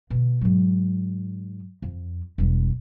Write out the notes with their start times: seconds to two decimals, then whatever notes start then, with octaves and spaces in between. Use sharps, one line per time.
0.10 B2 D3
0.41 G#2 F#3
1.82 F2
2.38 E1 G3